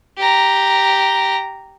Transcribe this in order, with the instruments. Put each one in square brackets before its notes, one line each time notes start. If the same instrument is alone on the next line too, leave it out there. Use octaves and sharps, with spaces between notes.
[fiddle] G4 A#5